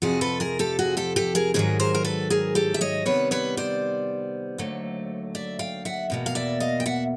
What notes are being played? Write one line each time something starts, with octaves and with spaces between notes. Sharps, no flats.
F2 C3 F3 F#4 G#4
A4 B4
G#4 A#4
G4 A4
F#4 G#4
G4 A4
G4 A4
G#4 A#4
G#2 D#3 F#3 G#4 A#4
A#4 C5
A#4
A4 B4
G#4 A#4
G4 A4
E5
C#5 D#5
C3 D#3 G3 B3 B4 C#5
B4 C#5
C5 D5
D#2 D3 F#3 A3
D5 E5
F5 G5
E5 F#5
E2 B2 A#3
F5
D5 E5
D#5 F5
G5
E5 F#5